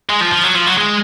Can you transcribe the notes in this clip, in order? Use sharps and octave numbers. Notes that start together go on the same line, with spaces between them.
G#3
F3
F3
F#3
F3
F#3
G#3